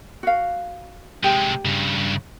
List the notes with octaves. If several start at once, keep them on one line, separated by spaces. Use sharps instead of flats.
F#4 F5
C3 G#3 G4
G2 C#3